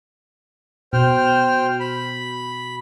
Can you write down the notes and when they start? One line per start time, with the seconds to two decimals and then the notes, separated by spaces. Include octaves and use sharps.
0.93 B2 C5 G5 F6
1.80 B5